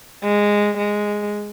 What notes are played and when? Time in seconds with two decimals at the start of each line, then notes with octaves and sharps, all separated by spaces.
0.23 G#3
0.78 G#3